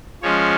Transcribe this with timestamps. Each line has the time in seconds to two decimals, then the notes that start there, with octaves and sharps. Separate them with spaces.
0.22 F3 G#3 C#4 C#5